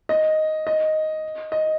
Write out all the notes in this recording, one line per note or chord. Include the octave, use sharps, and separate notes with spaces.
D#5
D#5
D#5